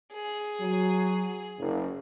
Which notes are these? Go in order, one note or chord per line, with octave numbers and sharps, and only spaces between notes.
G#4
F#3
F#1